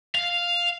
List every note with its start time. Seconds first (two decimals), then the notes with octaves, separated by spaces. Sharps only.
0.15 F5